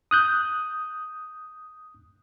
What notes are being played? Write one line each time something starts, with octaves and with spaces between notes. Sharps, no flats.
D#6 F#6 G6